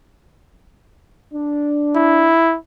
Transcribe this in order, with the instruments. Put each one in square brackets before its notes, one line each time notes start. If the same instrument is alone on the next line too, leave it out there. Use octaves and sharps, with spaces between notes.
[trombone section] D4
[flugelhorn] E4